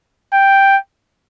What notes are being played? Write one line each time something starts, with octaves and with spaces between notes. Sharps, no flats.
G5